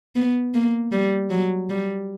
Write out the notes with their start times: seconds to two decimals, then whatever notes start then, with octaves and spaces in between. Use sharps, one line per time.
0.16 B3
0.54 A#3
0.92 G3
1.30 F#3
1.70 G3